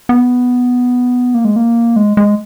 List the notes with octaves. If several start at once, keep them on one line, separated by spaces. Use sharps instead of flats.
B3
A#3
G#3
A#3
G#3
G#3